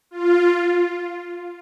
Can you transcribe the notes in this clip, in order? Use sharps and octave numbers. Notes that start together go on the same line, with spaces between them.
F4
F4